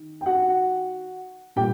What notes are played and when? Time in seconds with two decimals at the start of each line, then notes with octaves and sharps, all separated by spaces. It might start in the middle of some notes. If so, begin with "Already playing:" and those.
Already playing: D#3
0.21 G5
0.26 F#4 F#5
1.56 A#2 G3 G4 G5